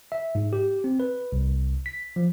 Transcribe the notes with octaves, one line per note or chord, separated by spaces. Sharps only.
E5
G#2
G4
C4
B4
C2
B6
F3